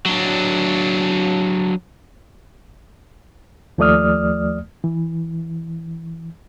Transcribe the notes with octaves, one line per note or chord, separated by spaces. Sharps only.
F#3 D4
D#2 F3 A3 D5 D#6 F6
E3